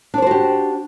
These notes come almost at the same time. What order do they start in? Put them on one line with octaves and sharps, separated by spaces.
D4 C#5 C5 F#4 G4